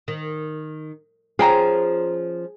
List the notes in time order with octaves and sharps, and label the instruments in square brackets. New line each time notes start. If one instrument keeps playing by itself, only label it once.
[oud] D#3
[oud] F3 C#4 F4 [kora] G#4 [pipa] F5 G5 A#5